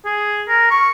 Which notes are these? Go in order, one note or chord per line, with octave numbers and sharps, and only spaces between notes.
G#4
A#4
C#6